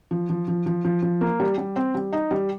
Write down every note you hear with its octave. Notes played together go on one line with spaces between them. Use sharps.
F3
F3
F3
F3
F3
F3
A#3
G3
G3
C4
G3
D#4
G3